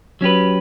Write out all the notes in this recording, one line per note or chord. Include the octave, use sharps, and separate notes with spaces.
F#3 C#4 G4 B4